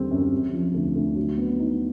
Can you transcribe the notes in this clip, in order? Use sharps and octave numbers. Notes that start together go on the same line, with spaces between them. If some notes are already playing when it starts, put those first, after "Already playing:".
Already playing: D#2 D3 G3 C4
F#2
C3
F3
D2
D2
F#3
B3
D#4